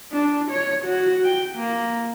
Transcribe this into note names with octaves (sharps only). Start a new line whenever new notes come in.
D4
C#5
F#4
G5
A#3